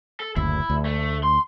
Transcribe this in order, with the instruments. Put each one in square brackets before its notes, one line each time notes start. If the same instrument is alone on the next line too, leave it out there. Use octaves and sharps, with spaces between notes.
[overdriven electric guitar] A4
[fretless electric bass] F#1 D2 [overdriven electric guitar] E4
[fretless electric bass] D2
[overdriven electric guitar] A3
C6